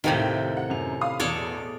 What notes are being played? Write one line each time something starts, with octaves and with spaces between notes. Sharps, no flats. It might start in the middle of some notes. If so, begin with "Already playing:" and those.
D#2 A2 C3 D#3 G5
F#5
F#2 F7
F5 B5 D#6
E2 B2 A4 C#5 D5